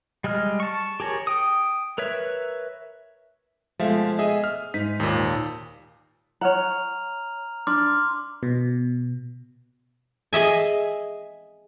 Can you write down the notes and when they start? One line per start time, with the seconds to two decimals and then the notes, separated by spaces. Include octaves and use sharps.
0.24 G3 G#3 D#5 F6
0.60 A5 C#6
1.00 G4 G#4 A#4 C#5
1.27 G5 D#6
1.98 A#4 B4 C#5 E5
3.79 B2 F3 G#3 A3 E5 F5
4.19 G#4 D#5 E5
4.44 F6
4.74 G#2 D#4 B6
5.00 D#2 A#2
6.41 C#5 F#5 A#5 F6 F7
7.67 D4 C6 D6 F6
8.43 B2
10.33 G#4 D#5 E5 G#5